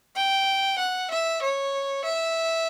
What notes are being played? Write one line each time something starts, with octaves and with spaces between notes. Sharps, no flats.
G5
F#5
E5
C#5
E5